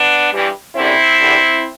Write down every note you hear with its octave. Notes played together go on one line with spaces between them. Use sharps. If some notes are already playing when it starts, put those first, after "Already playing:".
Already playing: B3 D4
G2 E3 G3
F#2 D3 G3 C4 E4
E2 D3 G3